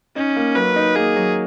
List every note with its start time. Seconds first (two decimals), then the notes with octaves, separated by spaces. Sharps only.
0.16 C#4 D#4
0.36 A#3
0.55 F#3 B4
0.76 D#4
0.96 A#3 G#4
1.16 F#3